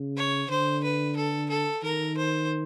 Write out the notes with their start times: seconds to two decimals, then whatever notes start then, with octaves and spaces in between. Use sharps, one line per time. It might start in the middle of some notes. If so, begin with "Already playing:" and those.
Already playing: C#3
0.17 C#5
0.49 D3 C5
0.84 B4
1.17 A4
1.49 A4
1.83 D#3 A#4
2.17 C5